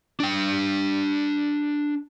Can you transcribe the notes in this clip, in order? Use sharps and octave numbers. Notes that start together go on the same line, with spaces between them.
D4 G5